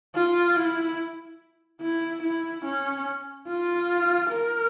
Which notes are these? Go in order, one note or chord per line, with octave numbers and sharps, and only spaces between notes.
F4
E4
E4
E4
C#4
F4
A#4